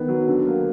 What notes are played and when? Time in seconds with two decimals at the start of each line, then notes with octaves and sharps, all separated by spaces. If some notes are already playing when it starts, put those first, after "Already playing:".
Already playing: D#3 B3
0.08 F#3
0.27 D3
0.46 A#3